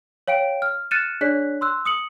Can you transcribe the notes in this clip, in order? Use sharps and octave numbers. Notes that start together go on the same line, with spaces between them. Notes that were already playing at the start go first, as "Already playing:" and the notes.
C#5 F5 G5 D7
F6
F6 F#6 A6 C#7 D#7 E7
D4 G#4 C#5 D5 F#6 B6
C6 E6 F#6
D#6 C#7 F#7